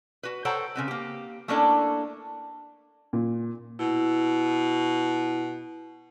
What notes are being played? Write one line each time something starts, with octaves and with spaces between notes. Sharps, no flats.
F#4 B4
A4 C5 C#5 F#5 G5 A#5
C#3 C4 B4
A#3 G4
A3 A#3 C#4 D4 E4 A4
A#2
B2 E4